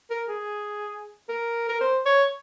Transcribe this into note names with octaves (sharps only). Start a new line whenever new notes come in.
A#4
G#4
A#4
A#4
C5
C#5